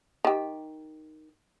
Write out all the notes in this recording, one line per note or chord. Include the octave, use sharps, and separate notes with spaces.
D#3 G4